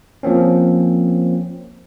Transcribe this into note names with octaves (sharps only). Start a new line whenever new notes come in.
F3 A#3 C4 C#4